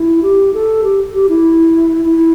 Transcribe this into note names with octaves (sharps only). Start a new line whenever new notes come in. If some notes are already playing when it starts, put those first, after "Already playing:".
Already playing: E4
G4
A4
G4
G4
E4
E4